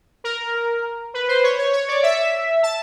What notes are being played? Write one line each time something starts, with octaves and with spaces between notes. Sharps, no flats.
A#4
B4
C5
C#5
C#5
C#5
D5
E5
A5